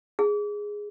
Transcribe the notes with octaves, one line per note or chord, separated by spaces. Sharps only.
G#4